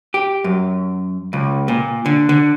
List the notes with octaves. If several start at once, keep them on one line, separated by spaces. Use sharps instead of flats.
G4
F#2
C#2
A#2
D3
D3